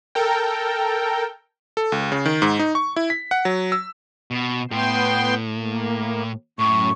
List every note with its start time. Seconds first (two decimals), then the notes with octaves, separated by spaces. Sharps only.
0.15 A4 A#4 G5
1.77 A4
1.92 C#2
2.12 C#3
2.26 D#3
2.42 G#2
2.59 D#4
2.75 C#6
2.96 E4
3.10 B6
3.31 F#5
3.45 F#3
3.72 E6
4.31 B2
4.71 A2 B3 G5 C6
5.57 A#3
6.59 F#2 A2 C#6